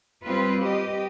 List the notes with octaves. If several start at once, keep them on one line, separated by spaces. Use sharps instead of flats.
G3 C4 F4 B4
G4 D#5